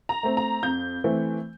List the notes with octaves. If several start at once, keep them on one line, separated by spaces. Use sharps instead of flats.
A#5
A3 C4
A#5
F2 G6
E3 A3 C4